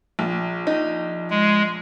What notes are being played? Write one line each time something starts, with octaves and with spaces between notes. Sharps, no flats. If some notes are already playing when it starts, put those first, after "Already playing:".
A#1
D#4
G#3